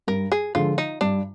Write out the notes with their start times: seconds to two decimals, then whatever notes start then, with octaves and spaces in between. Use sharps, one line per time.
0.08 G2 A#4
0.32 G#4
0.55 D3 F3 G#3 F4
0.78 D#4
1.01 G2 D4